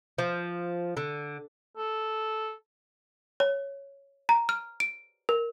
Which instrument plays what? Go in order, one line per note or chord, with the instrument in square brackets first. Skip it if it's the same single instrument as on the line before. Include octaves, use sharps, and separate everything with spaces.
[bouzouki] F3
D3
[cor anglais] A4
[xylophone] C#5
A#5
F6
D7
A#4